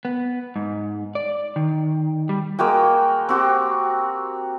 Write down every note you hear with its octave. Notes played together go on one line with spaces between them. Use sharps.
B3
G#2
D5
D#3
G3
G#3 A#3 F#4 G5
C4 F#4 G4